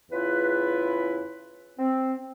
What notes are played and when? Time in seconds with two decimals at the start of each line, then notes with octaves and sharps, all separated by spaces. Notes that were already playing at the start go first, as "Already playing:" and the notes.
0.11 E2 C#3 E4 F4 B4
1.79 C4